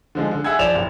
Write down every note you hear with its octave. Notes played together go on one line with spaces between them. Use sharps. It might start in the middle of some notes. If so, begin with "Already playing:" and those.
D3 F3 G#3
D3
G#4 E5 F#5 G#5 E6 G#6
F3 D5 E7 F7
F#1